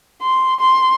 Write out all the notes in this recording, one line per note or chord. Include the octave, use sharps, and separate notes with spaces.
C6
C6